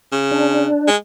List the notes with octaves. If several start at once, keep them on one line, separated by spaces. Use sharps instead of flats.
C#3
D4
G#3